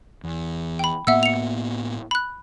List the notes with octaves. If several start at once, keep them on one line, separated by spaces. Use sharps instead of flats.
E2
G5 B5
A2 A#3 B3 E5 F#5 E6
C#7 F7
B5 F#6